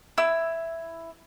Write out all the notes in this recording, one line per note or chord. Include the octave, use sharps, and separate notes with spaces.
E4 E6